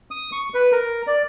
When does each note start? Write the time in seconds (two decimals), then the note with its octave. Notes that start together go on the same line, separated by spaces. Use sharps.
0.11 D#6
0.32 C#6
0.54 B4
0.72 A#4
1.07 D5